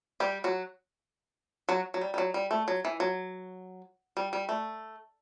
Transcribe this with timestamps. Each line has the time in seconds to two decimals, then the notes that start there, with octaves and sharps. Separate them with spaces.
0.20 G3 G4
0.44 F#3 F#4
1.69 F#3 F#4
1.94 F#3
2.01 G3
2.14 G3
2.18 F#3
2.34 G3
2.51 A3
2.68 F#3
2.85 E3
3.00 F#3
4.17 G3
4.33 G3
4.49 A3